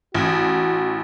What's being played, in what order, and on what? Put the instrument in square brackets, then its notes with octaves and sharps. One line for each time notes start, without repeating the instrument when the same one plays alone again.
[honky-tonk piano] A1 [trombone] F#4